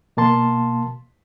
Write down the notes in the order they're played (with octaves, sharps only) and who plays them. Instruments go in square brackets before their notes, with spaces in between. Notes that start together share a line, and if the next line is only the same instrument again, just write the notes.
[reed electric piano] B2 A#3 A5 C6